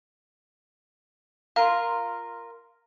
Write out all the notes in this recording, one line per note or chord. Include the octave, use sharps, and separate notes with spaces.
F4 A#4 F5